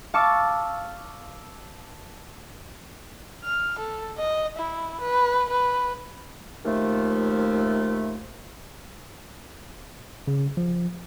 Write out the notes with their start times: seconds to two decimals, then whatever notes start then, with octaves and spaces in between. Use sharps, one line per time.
0.14 F5 A5 C#6 D6 E6
3.44 F6
3.78 A4
4.17 D#5
4.57 E4
5.00 B4
5.50 B4
6.65 D#2 F3 A3
10.28 C#3
10.57 F3